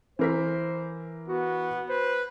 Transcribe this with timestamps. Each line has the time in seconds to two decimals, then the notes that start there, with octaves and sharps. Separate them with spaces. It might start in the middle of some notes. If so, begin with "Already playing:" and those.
0.19 E3 A#4 C5 B6
1.28 B3 F#4
1.89 B4 C5